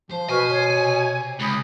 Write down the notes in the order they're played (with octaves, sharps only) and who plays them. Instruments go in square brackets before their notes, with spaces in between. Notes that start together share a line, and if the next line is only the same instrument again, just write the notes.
[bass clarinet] F3 [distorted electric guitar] C5
[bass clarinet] B2 [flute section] B4 C#6 F6 [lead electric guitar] G#5
[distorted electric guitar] C5 [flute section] C#5
[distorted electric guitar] C3
[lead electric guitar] C#2 [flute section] B5 D#6